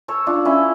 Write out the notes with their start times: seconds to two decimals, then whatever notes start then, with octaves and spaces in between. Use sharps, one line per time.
0.08 A4 C#5
0.27 D4 F4
0.45 C#4 E4